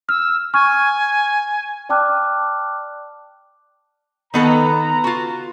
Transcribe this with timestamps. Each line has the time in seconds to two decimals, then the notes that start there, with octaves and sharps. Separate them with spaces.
0.09 E6 F6
0.54 G#5 C#6 F6
1.89 D5 G5 A5 D6 F6 F#6
4.34 D#3 B3 A4 B4 A#5
5.04 F4 F#4